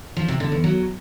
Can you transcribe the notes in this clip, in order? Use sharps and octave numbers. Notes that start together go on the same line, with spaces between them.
F3
C3
D3
E2
F#3